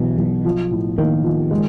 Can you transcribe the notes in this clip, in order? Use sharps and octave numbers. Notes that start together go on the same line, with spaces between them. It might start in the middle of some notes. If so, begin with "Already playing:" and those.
Already playing: B1 B2 E3
B1
F3
A2
D#3 A#3
F3
G#3